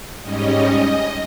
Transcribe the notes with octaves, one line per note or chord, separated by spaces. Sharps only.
G#2 G3 C#4 D#5